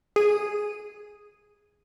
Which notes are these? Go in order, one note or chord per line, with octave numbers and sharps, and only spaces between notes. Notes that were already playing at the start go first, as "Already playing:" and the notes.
G#4 D#7